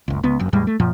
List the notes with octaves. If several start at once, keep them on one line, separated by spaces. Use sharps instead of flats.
F#1 C#2
C#2 B3
F#1 F#2
E2 A2 G3 G#3
A3
F#2 A#2 F3